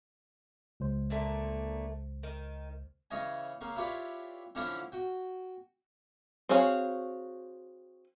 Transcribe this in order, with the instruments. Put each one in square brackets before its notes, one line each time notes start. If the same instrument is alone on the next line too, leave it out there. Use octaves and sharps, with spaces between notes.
[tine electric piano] C#2 C5
[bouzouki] A#2 D3 A3
D#3
[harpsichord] C#3 E3 C#5 D#5 G#5
C#3 A#3 C#6
E4 F4 G4 B4 C#5 D5
D3 E3 F3 C#4 D4 E4
F#4 G5
[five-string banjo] C4 F#4 G#4 C#5 F5